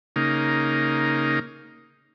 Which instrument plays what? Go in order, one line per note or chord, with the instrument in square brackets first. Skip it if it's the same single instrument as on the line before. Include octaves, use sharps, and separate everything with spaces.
[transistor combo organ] C#3 A#3 D#4